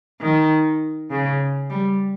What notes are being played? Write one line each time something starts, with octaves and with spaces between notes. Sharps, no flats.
D#3
C#3
G3